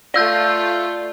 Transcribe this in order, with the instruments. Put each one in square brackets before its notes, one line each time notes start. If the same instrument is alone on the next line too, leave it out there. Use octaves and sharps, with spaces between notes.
[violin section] A3 F4 [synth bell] D5 E6 G6